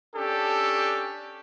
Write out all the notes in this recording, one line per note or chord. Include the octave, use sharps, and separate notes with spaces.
C#4 D4 G4 A4